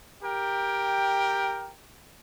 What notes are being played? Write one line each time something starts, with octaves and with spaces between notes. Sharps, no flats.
G4 A#4 G5